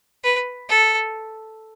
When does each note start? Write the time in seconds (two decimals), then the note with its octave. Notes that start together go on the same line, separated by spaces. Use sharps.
0.24 B4
0.69 A4